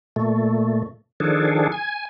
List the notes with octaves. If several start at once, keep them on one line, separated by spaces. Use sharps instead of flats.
A#2 A3
D#3 F3 D4 G#4 A4
G#5